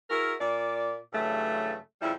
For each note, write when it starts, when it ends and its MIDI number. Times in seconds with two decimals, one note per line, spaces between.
0.10 0.34 64
0.10 0.34 66
0.10 0.34 68
0.10 0.34 70
0.41 0.97 46
0.41 0.97 74
1.13 1.76 43
1.13 1.76 49
1.13 1.76 52
1.13 1.76 54
1.13 1.76 57
2.02 2.13 41
2.02 2.13 49
2.02 2.13 55
2.02 2.13 64